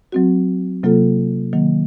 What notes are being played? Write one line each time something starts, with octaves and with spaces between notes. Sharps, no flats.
F#3 C4 F#4
C3 F#3 A#3 F4 A4
D#3 F#3 A#3